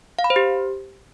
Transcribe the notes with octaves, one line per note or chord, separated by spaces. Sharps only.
F5
B5
C5
G4